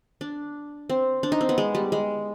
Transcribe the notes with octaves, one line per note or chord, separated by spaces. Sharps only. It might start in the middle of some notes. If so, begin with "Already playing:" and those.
D4
C4
D4
D#4
C4
B3
G#3
G3
G#3